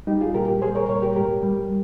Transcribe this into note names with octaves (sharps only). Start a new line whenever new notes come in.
G3 D#4 G4
F4 G#4
A#2 G4 A#4
G4 A#4
G3 G#4 C5
A#4 C#5
A#2 A#4 C#5
G4 A#4
G#2 G4 A#4
G3